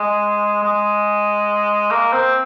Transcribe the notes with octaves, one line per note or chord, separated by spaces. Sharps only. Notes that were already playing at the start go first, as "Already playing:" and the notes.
Already playing: G#3
G#3
A#3
C4